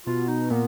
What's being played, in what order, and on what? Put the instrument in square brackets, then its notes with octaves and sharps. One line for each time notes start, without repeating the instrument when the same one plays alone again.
[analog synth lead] B2 [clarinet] F4
[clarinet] D#4
[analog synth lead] A#2 [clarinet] B3